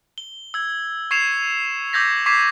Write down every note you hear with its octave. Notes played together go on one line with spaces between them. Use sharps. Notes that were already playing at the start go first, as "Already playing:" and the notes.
G7
E6 G#6
C#6 G#6 C7 C#7 E7 F7
D6 E6 G6 G#6 A#6 B6
C#6 D6 G#6 B6 C7 E7